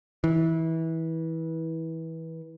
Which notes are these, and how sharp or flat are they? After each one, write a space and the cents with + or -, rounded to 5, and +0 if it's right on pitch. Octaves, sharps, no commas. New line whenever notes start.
E3 -25